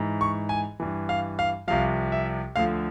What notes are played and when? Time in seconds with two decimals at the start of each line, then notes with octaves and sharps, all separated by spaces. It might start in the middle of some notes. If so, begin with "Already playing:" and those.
Already playing: G#2 E3
0.21 C#6
0.49 G#5
0.80 G2 E3
1.09 F5
1.39 F5
1.68 C2 C3 F3 F5
2.12 E5
2.56 D2 D3 F3 F5